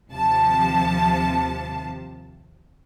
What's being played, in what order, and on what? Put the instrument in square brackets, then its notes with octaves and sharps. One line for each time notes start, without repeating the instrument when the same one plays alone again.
[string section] D#2 C3 F3 A5